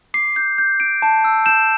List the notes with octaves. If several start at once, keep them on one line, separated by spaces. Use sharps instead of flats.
D6 C7
G6
G6
G6 D7
A5
E6
G6 E7